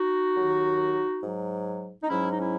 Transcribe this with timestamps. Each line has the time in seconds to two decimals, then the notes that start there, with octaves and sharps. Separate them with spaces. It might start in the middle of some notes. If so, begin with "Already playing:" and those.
Already playing: D#4 F#4
0.32 D#2 D#3 F#3
1.21 G#2 F#3
2.02 D#4
2.09 G#2 F#3 C#4 E4
2.29 D#4
2.39 C#4 E4